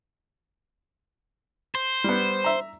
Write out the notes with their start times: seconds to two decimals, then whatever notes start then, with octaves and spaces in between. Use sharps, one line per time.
1.75 C5
2.04 G3 B3
2.44 E5 A#5